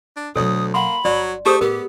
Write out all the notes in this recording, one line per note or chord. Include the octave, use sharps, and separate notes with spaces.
D4
D2 B2 F#3 A4 C#5 D#6
A#3 F#5 B5 C6
G1 F#3 D5
A3 G4 G#4 C5 D#6
A2 B3 G4 A#4